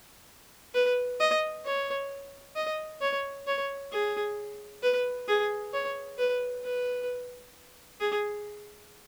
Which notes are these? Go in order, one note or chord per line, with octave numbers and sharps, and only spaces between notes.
B4
D#5
C#5
D#5
C#5
C#5
G#4
B4
G#4
C#5
B4
B4
G#4